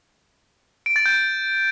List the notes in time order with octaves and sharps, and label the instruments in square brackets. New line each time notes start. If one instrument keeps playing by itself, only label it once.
[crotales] D7
A6
G6